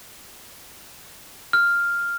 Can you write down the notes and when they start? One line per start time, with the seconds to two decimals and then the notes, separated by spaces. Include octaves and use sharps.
1.53 F6